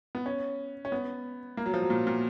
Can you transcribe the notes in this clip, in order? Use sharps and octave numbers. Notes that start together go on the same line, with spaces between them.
B3
C#4
C#4
B3
A#3
F#3
F3
F#3
A#2
A#2